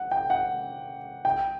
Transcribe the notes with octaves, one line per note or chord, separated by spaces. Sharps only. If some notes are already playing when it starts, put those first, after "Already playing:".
Already playing: F#5
G5
F#5
G5